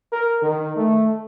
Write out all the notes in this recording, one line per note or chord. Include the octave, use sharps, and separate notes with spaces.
A#4
D#3
A3